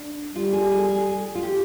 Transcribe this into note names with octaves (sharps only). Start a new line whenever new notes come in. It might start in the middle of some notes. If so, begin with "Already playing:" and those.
Already playing: D4
G3 F4
G#4
G#4
G#4
F4
G4